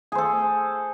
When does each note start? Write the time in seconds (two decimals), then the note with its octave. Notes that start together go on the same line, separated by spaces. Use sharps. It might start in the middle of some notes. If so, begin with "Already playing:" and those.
0.12 G#4
0.15 C5
0.18 A4